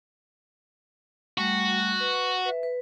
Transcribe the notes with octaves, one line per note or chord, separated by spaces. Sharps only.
G3 A3 F#4
B4
B4 E5
B4